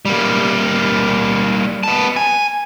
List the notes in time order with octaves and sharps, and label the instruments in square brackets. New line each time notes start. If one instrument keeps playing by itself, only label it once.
[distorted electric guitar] G3 A#3
B3 A5
G#5